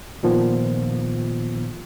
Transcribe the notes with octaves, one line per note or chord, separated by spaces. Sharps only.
A#2 D#3 F3 B3